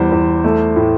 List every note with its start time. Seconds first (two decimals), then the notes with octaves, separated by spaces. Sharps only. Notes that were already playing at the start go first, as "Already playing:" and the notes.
Already playing: E2 G3 C5
0.12 E2
0.44 A3
0.76 A2